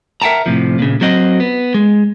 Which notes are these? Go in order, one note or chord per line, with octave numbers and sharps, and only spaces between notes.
A#4 E5 F#5 G5 A5 A#5
A2 C3 F3
A#2 C#3
F#3 C4 F#4 D#5
B3
G#3